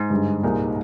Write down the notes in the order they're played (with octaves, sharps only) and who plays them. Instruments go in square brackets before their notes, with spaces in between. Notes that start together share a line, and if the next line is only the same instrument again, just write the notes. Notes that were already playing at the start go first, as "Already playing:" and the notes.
Already playing: [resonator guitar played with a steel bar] G#2
[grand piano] G2 D3 G#3
C2 A#2 G#3 D#4 A#4